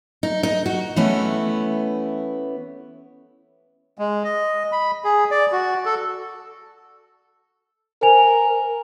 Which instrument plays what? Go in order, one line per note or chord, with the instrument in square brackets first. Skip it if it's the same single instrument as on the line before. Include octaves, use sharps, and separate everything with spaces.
[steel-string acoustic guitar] D#4
D#4
F#4
E3 A3 B3 C#4 E4
[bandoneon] G#3
D#5
B5
G#4
D5
F#4
A4
[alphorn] A#4 [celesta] C5 G#5 F7